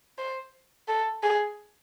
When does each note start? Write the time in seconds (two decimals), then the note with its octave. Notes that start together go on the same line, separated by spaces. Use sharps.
0.18 C5
0.88 A4
1.23 G#4